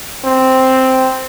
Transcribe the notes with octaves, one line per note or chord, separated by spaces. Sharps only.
C4